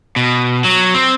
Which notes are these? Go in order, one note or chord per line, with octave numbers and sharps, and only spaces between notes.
B2
F#3
C4